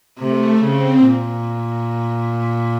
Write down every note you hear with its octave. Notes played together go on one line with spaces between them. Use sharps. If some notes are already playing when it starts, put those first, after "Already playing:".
C3 A3
C#3 C4
A#2